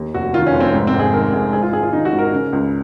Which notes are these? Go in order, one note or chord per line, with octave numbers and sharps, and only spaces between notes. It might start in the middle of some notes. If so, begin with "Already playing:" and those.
Already playing: D#2
F1 F#4
D#3 F4
C#4
F1
C4
G#2
C4
G#1
G#4
D#3 A#4
G#1 G#4
G#2 G#4
F4
G#1 G#4
F4
D#3 D#4
F#4
G#1
A#4
C#3
C#2